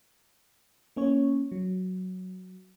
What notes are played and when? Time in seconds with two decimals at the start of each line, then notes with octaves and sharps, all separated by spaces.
0.96 A#3 C#4 C#5
1.52 F#3